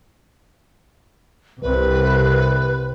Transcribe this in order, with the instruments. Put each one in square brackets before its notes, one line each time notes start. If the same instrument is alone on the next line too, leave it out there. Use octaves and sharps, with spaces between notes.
[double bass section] C2 C3 [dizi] B4